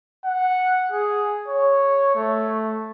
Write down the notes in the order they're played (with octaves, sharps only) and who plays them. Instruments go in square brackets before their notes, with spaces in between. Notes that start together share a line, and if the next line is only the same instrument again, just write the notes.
[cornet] F#5
G#4
C#5
A3